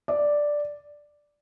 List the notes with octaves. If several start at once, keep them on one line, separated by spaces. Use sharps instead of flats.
D5